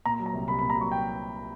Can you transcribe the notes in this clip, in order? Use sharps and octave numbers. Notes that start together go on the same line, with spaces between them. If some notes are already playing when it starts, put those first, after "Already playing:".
A#2 A#5
F#3
A#5
C2
C2 B5
B5
A#2
A#5
F#3 C#6
G5